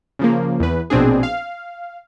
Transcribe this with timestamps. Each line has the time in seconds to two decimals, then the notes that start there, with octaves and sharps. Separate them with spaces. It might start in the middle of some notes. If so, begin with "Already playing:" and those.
0.19 C#3 F3 A#3
0.60 E2 B4
0.90 A#1 B2 C4 D4 G#4
1.23 F5